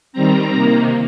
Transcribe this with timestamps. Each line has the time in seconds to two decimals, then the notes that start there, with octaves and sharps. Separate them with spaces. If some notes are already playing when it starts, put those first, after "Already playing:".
0.13 D#3 G3 C4 A#5
0.53 C3 D#3 A#3